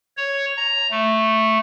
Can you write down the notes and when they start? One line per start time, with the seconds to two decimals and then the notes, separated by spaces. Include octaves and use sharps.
0.17 C#5
0.57 A#5
0.91 A3